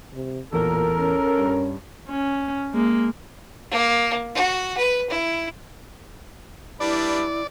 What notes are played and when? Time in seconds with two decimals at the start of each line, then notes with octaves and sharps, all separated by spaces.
0.13 C3
0.53 A1 E2 A#2 A4 A#4
0.99 C#4
1.38 G2
2.08 C#4
2.74 G#3 A#3
3.71 A#3
4.35 F#4
4.77 B4
5.10 E4
6.80 G3 D4 E4 B4 D5